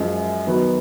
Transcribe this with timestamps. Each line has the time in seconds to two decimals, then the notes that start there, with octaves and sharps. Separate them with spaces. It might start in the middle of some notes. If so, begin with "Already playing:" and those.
Already playing: F#2 F3 G#3
0.47 D#3 F#3 B3